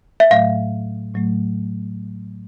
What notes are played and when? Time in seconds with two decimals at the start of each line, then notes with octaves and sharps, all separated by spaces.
0.20 E5
0.30 A2 F#3 A3 F5
1.14 A2 F#3 A3